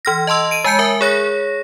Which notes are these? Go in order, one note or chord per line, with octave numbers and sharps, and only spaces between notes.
E3 F6 A#6
D#5 A5 C6 E6
D7 D#7
G#3 G#5 A5 G6 C#7
A#4 E5 G#5
G#4 C#5 A#6